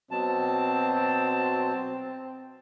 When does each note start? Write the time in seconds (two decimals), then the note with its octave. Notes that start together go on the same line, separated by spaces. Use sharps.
0.11 B2 F#3 C4 A5